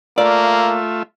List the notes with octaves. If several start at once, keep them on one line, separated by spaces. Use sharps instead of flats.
A3 A#3 F4 D5 E5